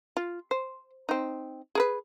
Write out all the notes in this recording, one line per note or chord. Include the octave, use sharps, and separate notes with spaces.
F4
C5
C4 D#4
G#4 A#4 B4